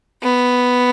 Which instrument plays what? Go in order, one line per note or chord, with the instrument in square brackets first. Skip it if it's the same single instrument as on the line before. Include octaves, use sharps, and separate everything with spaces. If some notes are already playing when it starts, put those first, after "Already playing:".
[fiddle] B3